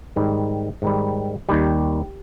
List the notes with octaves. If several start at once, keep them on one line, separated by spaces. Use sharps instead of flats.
G#2 D#3 G3
G#2 D#3 G3
D#2 D#3 G3 G4